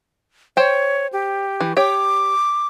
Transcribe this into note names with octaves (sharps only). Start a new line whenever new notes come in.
C5 C#5 G5
G4
E3
G4 C#5 G5 D6